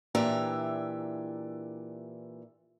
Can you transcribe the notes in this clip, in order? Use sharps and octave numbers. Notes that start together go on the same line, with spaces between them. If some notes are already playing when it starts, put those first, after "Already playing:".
A#2 E3 D4 G4 E5 A#5